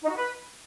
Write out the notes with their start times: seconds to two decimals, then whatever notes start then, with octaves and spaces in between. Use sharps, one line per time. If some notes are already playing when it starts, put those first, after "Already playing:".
0.02 D#4
0.09 F#4
0.16 B4